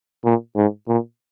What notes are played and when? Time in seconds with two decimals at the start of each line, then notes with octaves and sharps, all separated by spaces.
0.24 A#2
0.56 G#2
0.88 A#2